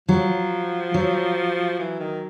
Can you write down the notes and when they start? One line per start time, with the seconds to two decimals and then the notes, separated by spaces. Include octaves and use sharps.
0.09 F3 F#3
0.94 F#3
1.79 E3
2.00 D#3